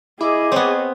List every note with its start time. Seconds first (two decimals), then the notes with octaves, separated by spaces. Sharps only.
0.21 E4 G#4 D#5 D6
0.52 B3 C4 C#5